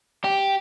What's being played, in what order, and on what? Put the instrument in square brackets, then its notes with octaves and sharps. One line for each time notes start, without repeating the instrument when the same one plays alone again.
[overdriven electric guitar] G4